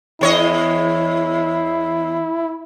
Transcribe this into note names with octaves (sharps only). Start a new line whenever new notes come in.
E2 E4 C#5 D#5